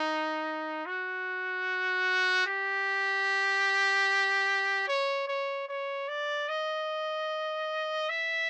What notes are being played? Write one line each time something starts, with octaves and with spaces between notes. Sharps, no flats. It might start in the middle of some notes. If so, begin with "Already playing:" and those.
Already playing: D#4
F#4
G4
C#5
C#5
C#5
D5
D#5
E5